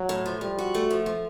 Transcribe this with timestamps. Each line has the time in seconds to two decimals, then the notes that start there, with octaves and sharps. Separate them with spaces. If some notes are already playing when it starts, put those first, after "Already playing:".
Already playing: F#3
0.09 A2
0.26 F3
0.41 F3 G3
0.59 F#4
0.75 A3
0.91 F3
1.06 F3